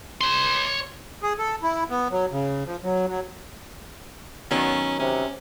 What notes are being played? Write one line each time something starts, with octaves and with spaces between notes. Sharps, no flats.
C#5 C6
G#4
A4
E4
B3
F#3
C#3
F3
F#3
F#3
D#3 F#3 B3 C#4
C3 C#4